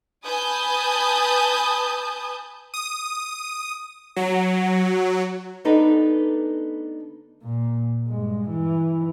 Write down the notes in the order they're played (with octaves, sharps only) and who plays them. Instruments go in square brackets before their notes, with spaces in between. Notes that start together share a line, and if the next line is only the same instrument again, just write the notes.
[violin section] B4 G#5 A5 D#6 G6
[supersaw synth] D#6
F#3
[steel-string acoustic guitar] D2 B3 D4 D#4 A4 B4
[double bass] A#2
G2 G#3
E3